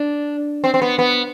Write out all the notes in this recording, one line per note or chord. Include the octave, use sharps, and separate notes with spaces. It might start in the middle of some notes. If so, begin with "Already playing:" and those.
Already playing: D4
C4
C4
B3
B3